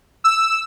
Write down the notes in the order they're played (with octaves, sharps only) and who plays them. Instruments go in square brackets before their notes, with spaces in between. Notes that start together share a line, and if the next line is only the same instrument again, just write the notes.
[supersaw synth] E6